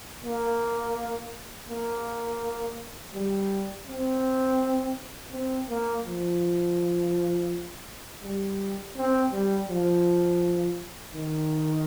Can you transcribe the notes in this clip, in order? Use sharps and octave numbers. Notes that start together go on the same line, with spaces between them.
A#3
A#3
G3
C4
C4
A#3
F3
G3
C4
G3
F3
D#3